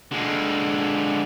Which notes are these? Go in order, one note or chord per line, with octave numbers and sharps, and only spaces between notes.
D3 G#3